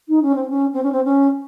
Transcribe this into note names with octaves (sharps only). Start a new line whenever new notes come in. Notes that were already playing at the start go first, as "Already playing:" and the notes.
D#4
C#4
C4
C#4
C4
C#4
C4
C#4